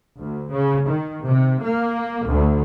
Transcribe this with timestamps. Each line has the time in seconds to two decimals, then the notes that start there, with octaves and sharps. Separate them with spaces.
0.20 D2
0.53 C#3
0.88 D#3
1.27 C3
1.63 A#3
2.28 D2